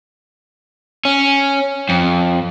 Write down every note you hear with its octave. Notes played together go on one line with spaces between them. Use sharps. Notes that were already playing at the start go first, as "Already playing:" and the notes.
C#4
F2